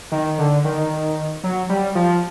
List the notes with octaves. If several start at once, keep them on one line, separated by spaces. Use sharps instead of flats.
D#3
D3
D#3
F#3
G3
F3